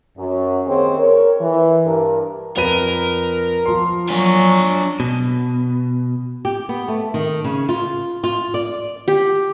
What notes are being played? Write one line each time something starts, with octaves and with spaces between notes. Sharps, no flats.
F#2
D#2 C4 G#4 C5 C#5
A#4 C#5
E3
G2 A#4
F2 A#4 B4 D#7
F3 C6
F#3 D4 G#5
B2
G4
B3
A3
D#3
C#3
F4
F4
D5
G4